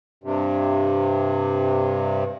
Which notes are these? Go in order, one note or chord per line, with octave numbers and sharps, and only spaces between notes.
G2 C3